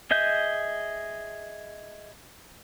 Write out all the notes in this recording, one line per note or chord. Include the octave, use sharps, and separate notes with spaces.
G#4 D#5 E5 G6